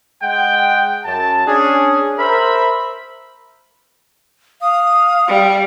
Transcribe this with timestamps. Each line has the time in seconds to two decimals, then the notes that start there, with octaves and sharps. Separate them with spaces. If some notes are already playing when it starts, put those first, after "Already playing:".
0.22 G#3 F#5 G5
1.05 F#2 A5
1.46 C#4 D4 G#4
2.19 A#4 C5 E5 B5
4.61 F5 D#6
5.28 G3